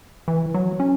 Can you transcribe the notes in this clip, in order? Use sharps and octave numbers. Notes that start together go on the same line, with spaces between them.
E3
F#3
C#4